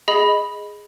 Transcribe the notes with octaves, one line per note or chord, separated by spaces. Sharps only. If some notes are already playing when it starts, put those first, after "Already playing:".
G#4 D#5 B5